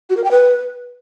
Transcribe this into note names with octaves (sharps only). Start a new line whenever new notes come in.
F#4
A#4
G5
B4